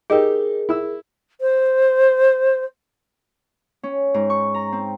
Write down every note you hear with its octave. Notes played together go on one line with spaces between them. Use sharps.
D#4 G4 G#4 A#4
E4 E6
C5
C#4
G#2
C#6
A#5
C4